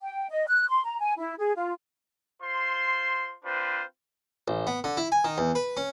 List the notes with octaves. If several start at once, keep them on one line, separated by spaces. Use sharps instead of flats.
G5
D#5
F#6
C6
A#5
G#5
E4
G#4
F4
F4 C5 C6
C4 D4 F4 B4 C5
A1
B3
D3
E4
G#5
D#3
E2
B4
C#4